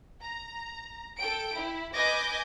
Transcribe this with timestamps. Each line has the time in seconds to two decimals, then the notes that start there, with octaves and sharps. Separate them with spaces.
0.22 A#5
1.18 A4 G5 D7
1.55 E4
1.94 B4 D#5 G#5 D6 G6 A#6